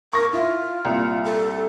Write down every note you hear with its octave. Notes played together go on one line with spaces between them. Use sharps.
A#4 C#6 A#6
E4 F4
C2 A#2
A4